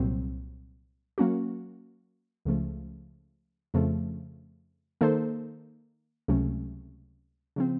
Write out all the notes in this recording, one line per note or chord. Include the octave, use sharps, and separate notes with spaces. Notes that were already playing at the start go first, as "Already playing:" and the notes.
Already playing: C2 A#2 F#3 C4
F#3 A#3 C#4 F#4
C#2 C#3 F3 A3
F2 C#3 F3 A3
D#3 A#3 D#4 A4 C5
C#2 C3 F#3 A3 C#4
C#3 F3 C4